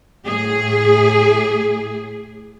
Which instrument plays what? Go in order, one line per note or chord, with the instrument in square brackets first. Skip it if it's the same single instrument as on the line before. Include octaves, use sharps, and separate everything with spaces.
[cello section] A2 G#4